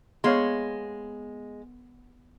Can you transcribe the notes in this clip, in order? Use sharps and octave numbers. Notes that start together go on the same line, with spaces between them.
G#3 B3 C#5 F5 C6